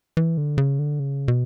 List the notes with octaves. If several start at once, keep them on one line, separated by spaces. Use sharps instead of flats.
E3
D3
C#3
D3
C#3
B2